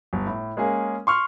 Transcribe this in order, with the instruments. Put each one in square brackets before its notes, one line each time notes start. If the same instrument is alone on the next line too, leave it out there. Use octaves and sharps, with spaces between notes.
[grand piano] G1
A2
G#3 A#3 C#4 G#4
C6 C#6 F6